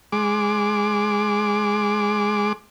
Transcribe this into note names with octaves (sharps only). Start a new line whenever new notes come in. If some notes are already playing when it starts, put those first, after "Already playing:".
G#3 D6